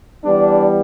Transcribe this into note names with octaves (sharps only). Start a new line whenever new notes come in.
E3 G3 B3 D4